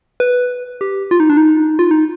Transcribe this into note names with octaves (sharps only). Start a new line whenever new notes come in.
B4
G4
F4
D#4
D4
D#4
F4
D#4